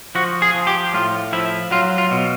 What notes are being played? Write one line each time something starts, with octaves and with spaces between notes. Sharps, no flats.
F3 F#4
G#4
F3
G4
A2 F4
F3 E4
F#3 F4
F4
B2